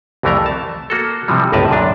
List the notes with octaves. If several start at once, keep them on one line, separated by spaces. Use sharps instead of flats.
C2 F2 E3 A3 A#4 A#5
A5
A#3 F#4 A4
C3 E3 F3 G3
G1 C#2 A2 A#4 B4 A5
F#2 A#2 D4